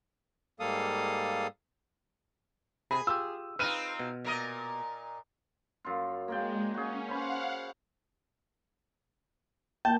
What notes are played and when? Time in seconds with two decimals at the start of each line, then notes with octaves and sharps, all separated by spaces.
0.60 G#2 G3 A#3 A4 F5 D#6
2.91 C3 G#4 B5
3.07 F4 G4 E6
3.59 C4 D#4 F4 B4 F6 D#7
4.00 B2
4.24 A#2 A#4 D#5
5.85 F#2 F4
6.28 G#3 A#3 D5 G5
6.74 C#4 F#4 G#4
7.08 C#4 C5 F5 F#5 B5
9.85 A#3 G5 A5